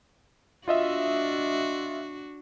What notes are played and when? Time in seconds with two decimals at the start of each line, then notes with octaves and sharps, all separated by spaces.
0.68 D4 F4 F#4 D#5 E5